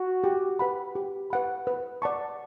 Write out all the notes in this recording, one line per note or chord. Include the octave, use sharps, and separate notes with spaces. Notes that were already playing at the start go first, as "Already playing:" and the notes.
Already playing: F#4
G4
B4 F#5 B5
G4
B4 F#5 B5
B4
D5 F#5 A5 C#6